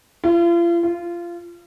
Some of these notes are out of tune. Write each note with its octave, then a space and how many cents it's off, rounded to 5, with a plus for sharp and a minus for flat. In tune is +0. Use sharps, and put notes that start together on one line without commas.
F4 -40
F4 -20